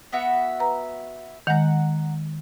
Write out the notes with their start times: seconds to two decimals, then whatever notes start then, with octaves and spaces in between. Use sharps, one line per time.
0.12 B3 F#4 E5
0.60 B4 A#5
1.47 D#3 G#3 F#5 A#5